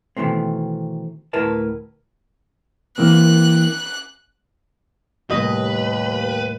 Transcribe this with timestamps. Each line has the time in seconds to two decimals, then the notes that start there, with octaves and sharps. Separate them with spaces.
0.17 B2 D#3 E3 A3 C4
1.33 D2 A2 E4 A#4 B4 A5
2.98 E3 A#3 C4 F#6
5.31 D#2 A2 C3 G3 B4 D#5